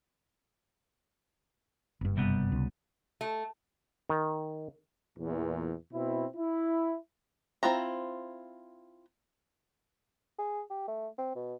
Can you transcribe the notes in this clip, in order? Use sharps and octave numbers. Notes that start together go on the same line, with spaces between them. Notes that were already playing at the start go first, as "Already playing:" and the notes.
F#1 G2
C3 G3 B3
C#2
A3
D#3
E2 A#2
B2 C4 E4
E4
C4 E4 F4 A#5
G#4
G4
A3
C4
B2